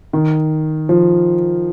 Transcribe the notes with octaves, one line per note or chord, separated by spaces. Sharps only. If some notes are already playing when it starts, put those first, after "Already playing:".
D#3
F3